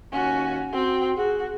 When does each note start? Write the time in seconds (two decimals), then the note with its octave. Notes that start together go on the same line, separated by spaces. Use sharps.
0.12 D#2 C#4 F#4
0.73 C4 F#4 G5
1.17 F#4 G#4